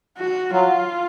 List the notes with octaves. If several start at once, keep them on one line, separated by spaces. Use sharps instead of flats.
F#4
F#3 F4